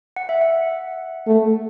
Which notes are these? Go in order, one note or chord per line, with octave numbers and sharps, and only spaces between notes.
F#5
E5
F#5
A3